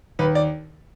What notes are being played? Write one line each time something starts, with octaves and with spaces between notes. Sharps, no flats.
D#2 B4
D5